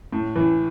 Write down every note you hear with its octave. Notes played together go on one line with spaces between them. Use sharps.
A2
E3